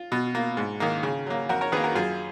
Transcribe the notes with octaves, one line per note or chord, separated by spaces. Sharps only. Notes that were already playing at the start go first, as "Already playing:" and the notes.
Already playing: F4
B2
A#3
G#2
D#3 A#3
C#3
F#3 A#3
F2 F#4 A#4
A#4 C#5
D#3 A#3 G#4 B4
F#4 A#4
F#2 F4 G#4